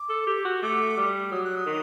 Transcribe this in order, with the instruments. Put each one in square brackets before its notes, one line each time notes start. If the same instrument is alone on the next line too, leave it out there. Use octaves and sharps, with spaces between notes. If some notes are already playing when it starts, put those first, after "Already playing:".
Already playing: [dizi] D6
[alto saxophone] A4
G4
F#4
[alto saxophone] A3 [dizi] D6
[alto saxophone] G3
[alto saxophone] F#3 [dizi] D#6
[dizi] F#6
D#6
[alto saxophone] D#3